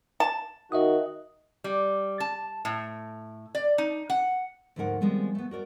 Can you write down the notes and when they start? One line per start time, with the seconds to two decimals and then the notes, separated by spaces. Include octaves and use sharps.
0.20 A5
0.72 D#3 F#4 D#5 E5 D#6
1.64 G3
2.20 A5
2.65 A2
3.55 D5
3.78 D#4
4.10 F#5
4.76 D2 G#2 F3 D#4 A#4 F#5
5.01 D#3 F3 G3 G#3 B3 C4
5.35 A3 B3
5.51 F#4 A#4 C#5 D5